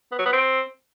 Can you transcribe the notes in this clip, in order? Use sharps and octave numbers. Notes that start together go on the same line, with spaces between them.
B3
F#3
B3
C4